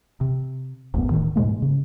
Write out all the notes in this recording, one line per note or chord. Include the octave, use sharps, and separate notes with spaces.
C3
F#1 D2 A2 B3
D1 D#2 A2 D#3
G#2 B2 G#3 A#3
C#3